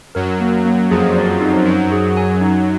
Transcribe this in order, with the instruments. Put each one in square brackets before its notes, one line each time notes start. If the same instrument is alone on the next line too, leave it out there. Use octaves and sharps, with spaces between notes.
[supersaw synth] F#2 F#3 [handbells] A#4
[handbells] A#3
A#3
[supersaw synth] F2 F3 [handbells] G#4
[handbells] D5
D#4
[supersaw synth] F#2 F#3 [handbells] C5
[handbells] G#4
G#5
D#4